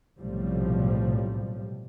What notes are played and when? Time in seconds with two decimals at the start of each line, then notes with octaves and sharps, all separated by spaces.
0.20 B1 A2 C3 F3 G3